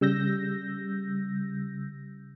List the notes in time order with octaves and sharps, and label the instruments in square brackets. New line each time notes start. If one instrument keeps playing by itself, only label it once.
[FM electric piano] C#3 G3 E6 G6 A#6